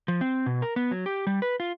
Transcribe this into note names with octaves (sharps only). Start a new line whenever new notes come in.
F3
C4
B2
A#4
B3
F#3
G4
G3
B4
F4